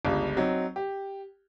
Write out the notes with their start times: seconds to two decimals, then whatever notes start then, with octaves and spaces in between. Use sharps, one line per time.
0.05 G1 C#2 G3
0.37 F#3 C4 D#4
0.76 G4